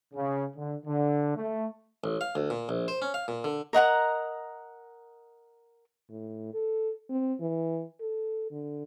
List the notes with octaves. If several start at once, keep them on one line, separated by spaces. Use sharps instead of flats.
C#3
D3
D3
A3
A1
F5
D2
A#2
A#1
C5
C#4
F5
A#2
D3
A#4 D#5 F#5 A#5
A2
A4
C4
E3
A4
D3